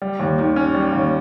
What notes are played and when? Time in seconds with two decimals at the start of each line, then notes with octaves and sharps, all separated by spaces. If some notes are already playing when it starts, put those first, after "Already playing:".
0.02 G3
0.19 D#2
0.38 D#3
0.56 C#4
0.74 G3
0.92 D#2